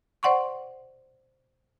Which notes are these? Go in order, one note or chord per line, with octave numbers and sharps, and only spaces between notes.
C5 D5 F#5 C6 C#6